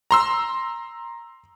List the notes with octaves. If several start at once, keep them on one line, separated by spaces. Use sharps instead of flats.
A#5 C6 E6